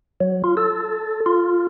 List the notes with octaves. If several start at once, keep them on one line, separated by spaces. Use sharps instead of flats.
F#3
F4
A4
F4